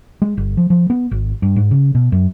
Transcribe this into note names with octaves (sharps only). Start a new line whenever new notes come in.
G#3
G1
F3
F3
B3
G#1
G2
G#2
C#3
B2
F#2